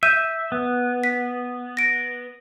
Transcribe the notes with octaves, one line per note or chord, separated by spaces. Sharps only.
E5 G6 D#7
B3
B6
A#6 D7